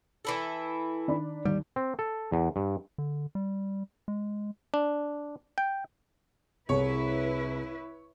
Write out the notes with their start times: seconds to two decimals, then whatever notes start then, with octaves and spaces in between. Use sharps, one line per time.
0.25 E3 E4 A4
1.08 D#3 D4 B5
1.45 D#2 G3
1.76 C4
1.99 A4
2.32 E2
2.56 G2
2.98 D3
3.35 G3
4.08 G#3
4.74 D4
5.58 G5
6.69 C2 E4 G#4 B4 C#5